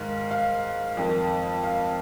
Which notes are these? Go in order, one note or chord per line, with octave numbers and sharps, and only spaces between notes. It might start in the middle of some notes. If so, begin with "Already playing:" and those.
Already playing: G#2 D#3 F5
F5
F2 D#3
F5